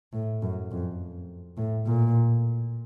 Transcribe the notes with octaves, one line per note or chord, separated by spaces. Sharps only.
A2
F#2
F2
A2
A#2